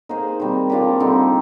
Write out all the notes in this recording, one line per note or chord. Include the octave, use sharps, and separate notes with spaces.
A#3 D#4 G#4 C5
D#3 G3 C4
F3 A#3 D4 G4
D3 G3 C4 D#4